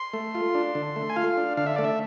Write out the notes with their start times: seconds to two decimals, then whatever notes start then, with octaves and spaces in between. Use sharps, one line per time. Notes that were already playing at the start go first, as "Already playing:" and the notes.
Already playing: C6
0.13 A3
0.35 F4
0.55 D4
0.75 D3
0.96 A3
1.10 G#5
1.16 F4 F5
1.37 D4
1.57 D3 F5
1.67 E5
1.76 A3 D5
1.84 E5